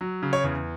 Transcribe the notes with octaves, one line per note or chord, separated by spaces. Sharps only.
F#3
C#3
C#5
E2